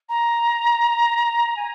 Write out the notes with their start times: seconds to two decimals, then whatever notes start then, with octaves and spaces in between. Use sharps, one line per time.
0.09 A#5
1.57 G#5